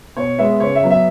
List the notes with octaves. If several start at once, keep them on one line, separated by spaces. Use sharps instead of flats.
B2 C#5
G#3 B3 E5
C#3 C#5
E5
F#3 B3
E5